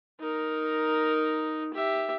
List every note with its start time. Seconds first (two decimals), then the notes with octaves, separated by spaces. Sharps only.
0.20 D#4 A#4
1.74 G4 E5